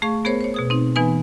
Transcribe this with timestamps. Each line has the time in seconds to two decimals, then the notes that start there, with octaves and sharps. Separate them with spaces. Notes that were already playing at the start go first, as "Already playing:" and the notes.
0.02 A3 G#4 F5 C#6
0.25 B3 G#4 A#4 C5 C#5
0.41 C5 C#5
0.54 B2 G#4 D#6
0.70 C4 D#4
0.96 E3 B3 D#4 B4 G#5